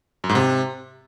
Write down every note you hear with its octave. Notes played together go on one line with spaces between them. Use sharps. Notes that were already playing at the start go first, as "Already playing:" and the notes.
F#2
G#2
C3